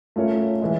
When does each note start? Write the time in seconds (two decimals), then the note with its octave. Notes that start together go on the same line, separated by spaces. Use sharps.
0.16 A3 C#4 F4 A#4 C#5
0.62 E3 G#3